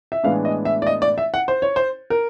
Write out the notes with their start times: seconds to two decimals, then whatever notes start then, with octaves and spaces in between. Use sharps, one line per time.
0.12 E5
0.23 A2 E3 G#3 B3 D4 F5
0.45 D#5
0.65 E5
0.82 D5
0.87 D#5
1.02 D5
1.18 E5
1.34 F#5
1.48 C5
1.62 C#5
1.76 C5
2.10 A#4